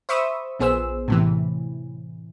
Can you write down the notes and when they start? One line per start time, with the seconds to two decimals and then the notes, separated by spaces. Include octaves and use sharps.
0.09 C5 E5 B5 C#6 D#6 E6
0.59 A#1 B3 G#4 C5 E6
1.08 A2 C3 E3